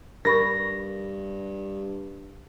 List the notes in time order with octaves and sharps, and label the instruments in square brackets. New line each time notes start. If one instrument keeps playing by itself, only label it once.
[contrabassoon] G2 [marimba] A#4 B5 C#6 [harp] A#6